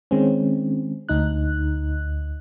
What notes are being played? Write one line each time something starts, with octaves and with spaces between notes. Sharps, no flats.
D#3 G#3 C4 C#4
D2 D#4 F#6